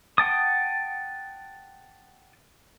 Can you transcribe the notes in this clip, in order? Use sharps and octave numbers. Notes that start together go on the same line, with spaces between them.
F#5 G5 A5 D#6